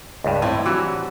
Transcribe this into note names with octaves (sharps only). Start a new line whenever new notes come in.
C#2 G2
A2 C4 E4 B4
E3 F#3 G3 D4